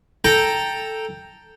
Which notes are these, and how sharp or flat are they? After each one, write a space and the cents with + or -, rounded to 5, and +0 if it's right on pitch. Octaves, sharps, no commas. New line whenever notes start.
A4 +0 G5 +0 A#5 +0